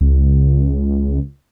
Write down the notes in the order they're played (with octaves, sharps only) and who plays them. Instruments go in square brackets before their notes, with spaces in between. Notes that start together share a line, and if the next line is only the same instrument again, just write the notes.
[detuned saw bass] C#2